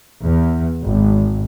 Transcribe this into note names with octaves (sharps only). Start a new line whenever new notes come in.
E2
G#1